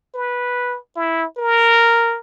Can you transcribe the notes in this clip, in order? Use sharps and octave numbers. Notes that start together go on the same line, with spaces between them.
B4
E4
A#4